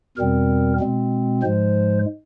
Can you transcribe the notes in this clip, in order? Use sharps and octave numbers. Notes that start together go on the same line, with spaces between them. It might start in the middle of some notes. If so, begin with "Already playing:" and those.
E2 B2 G3 C4 A#4
B2 G#3 C4
G#2 F3 G#3 C5